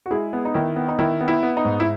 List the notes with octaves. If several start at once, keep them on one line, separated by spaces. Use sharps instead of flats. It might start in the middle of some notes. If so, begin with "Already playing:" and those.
F#4
G#3 E4 G#4
B3
D#4
D#3 E4
B3
D#4
D#3 E4
B3
E4
B3
D#4
G#2
E4